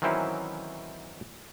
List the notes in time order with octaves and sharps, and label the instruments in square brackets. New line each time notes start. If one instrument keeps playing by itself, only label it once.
[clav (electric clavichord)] D#3 E3 F#3 C4 C#4 E4